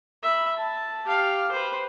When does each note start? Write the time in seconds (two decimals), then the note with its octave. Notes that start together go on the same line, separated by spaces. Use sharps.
0.23 E5 B5
0.56 A5
1.06 G4 F5
1.51 B4 C5